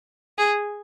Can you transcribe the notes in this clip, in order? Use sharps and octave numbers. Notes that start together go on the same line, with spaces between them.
G#4